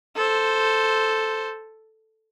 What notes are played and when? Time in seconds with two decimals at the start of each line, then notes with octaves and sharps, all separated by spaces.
0.16 A4 C5